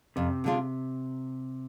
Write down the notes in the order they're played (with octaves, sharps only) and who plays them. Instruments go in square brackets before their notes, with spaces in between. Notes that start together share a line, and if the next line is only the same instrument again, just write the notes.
[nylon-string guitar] F2 [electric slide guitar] C3
[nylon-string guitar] D3 G#3 D4 F4